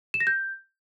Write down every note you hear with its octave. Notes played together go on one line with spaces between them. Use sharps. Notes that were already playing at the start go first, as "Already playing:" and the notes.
E7
A#6
G6